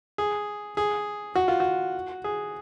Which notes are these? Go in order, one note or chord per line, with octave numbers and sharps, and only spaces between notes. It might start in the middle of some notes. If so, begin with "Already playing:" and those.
G#4
G#4
F#4
F4
F#4
G#4